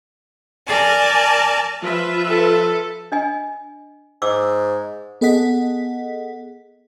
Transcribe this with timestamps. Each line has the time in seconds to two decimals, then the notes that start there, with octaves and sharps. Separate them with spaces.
0.67 A#4 D5 G#5 A5
1.83 F3 F4 B4 E5
2.28 A4
3.12 D4 D#5 G#5
4.22 G#2 D6 E6
5.21 B3 G#4 A4 D#5 F#5 B6